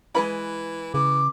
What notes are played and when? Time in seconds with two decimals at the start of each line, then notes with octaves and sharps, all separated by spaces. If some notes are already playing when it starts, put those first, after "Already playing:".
0.15 E3 G#3 B4 B5
0.94 C#3 E3 D6